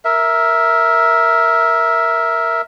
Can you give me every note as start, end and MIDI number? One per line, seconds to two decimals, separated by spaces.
0.05 2.61 70
0.05 2.61 76